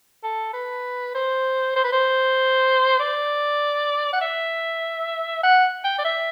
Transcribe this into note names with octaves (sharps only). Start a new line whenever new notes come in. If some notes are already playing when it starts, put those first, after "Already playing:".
A4
B4
C5
C5
B4
C5
D5
F#5
E5
F#5
G5
D5
E5